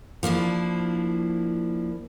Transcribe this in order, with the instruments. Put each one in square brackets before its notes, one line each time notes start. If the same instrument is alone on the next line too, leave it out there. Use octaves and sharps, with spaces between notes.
[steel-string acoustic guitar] F3 A#3 D4 E4